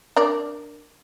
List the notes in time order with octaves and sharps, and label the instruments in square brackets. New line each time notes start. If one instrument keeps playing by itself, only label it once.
[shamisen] D4 A#4 D5